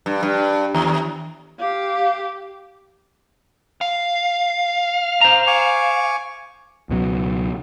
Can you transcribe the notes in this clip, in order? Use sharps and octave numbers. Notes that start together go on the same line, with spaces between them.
G2
G2
D#2
G4 F5
F5
C5 A#5
G#5 C#6 D6
C#2 B2 F#3